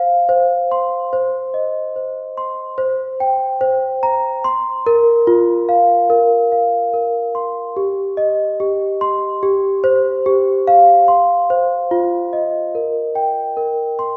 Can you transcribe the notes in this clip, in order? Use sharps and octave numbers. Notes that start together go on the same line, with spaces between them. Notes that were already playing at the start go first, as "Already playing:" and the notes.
Already playing: C5 F5
C5
C6
C5
D#5
C5
C6
C5
G5
C5
A#5
C6
A#4
F4
F5
A#4
F5
A#4
C6
G4
D#5
G4
C6
G4
C5
G4
F5
C6
C5
F4
D#5
A#4
G5
A#4
C6